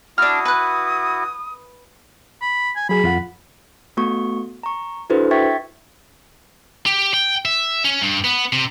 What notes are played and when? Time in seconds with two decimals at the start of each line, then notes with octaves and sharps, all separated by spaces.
0.18 D4 E4 F#4 D#6 F6
0.45 B4 F#6
2.41 B5
2.76 G#5
2.89 F#3 G#4 B5
3.04 F2 F4 F#5
3.97 A3 B3 F#4 C#6
4.63 A#5 C#6
5.10 D4 E4 F#4 A4 B4 C5
5.31 E5 G5 C#6 G#6 A6 B6
6.86 G4
7.14 G5
7.45 E5
7.84 C#4
8.02 G2
8.24 B3
8.53 C3